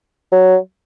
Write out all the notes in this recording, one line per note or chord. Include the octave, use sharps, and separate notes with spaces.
F#3